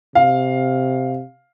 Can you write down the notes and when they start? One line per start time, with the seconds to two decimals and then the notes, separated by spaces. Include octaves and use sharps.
0.15 C3 F5